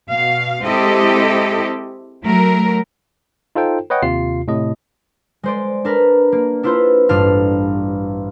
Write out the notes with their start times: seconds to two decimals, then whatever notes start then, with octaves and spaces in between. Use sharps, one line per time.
0.11 B2 F5
0.63 G#3 C4 E4 G4 A4 D#5
2.24 F#3 A3 A#4
3.55 D#4 F4 A4 C5 G5
3.90 B4 C#5 D#5 F#5 G5
4.03 D#2 C3 F4 C7
4.48 A2 C3 D#5
5.43 G#3 C5 D5
5.85 D4 A#4 B4
6.32 A#3
6.63 D4 E4 F4 B4 C5
7.09 A1 G2 D4 F4 F5